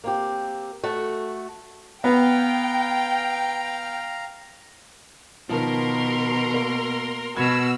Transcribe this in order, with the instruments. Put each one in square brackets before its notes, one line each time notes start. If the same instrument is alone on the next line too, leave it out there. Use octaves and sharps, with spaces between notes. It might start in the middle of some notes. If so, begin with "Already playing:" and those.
[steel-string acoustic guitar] A#3 C4 G4
A3 F#4
[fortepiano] B3 [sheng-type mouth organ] F5 A#5 [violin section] G5
[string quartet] B2 [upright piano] D#3 F3 [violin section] A#4 C6
[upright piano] A#3
[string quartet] B2 [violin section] F#4 E6 F6 [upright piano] B5 G#6